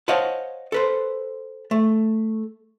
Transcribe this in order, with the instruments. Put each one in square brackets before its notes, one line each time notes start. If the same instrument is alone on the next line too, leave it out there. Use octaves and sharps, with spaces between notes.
[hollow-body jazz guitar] C5 C#5 D#5 F5 F#5 A5
A4 B4 C5
A3